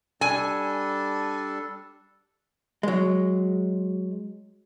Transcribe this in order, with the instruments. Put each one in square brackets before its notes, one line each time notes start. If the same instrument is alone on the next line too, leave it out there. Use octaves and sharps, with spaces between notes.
[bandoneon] G3 D4 A4 [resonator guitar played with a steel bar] G#5
[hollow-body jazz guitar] F#3 G#3